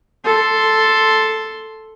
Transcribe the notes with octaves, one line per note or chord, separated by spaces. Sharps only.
A4 C6